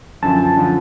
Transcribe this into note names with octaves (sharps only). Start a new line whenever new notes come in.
F#2 D3 F3 A5
D3 F3